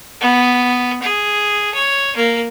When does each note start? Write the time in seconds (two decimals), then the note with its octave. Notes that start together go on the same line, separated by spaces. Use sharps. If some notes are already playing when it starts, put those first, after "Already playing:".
0.21 B3
1.03 G#4
1.74 C#5
2.16 A#3